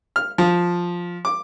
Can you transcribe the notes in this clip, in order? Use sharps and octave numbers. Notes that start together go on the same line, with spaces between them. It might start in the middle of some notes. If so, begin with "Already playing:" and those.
F6
F3
D6